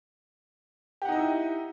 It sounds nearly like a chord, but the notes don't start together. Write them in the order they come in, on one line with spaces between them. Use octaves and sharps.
G4 F#5 D#4 D#5 E4